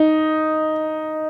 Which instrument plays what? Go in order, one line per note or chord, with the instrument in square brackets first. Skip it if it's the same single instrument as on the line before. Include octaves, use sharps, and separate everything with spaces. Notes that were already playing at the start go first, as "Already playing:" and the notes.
Already playing: [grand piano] D#4